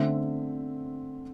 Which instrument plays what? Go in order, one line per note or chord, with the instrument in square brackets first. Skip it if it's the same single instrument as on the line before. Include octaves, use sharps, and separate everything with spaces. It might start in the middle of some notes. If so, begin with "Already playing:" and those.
Already playing: [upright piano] D3 A3 C4 E5